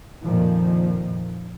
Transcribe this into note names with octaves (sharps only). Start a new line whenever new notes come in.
F2 A#2 D#3 F3